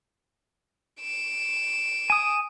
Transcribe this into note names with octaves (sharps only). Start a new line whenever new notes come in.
D7 E7
G#5 D#6